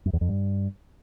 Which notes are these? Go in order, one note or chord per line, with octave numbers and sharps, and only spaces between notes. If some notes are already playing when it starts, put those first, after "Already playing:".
F#2
E2
F2
G2